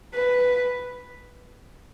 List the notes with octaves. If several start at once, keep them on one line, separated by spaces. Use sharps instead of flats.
B4